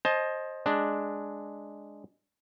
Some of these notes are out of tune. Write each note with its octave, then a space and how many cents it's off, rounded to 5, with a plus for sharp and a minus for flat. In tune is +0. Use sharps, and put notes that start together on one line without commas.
C5 +20 D#5 +0 A5 -35
G#3 +0 D4 +0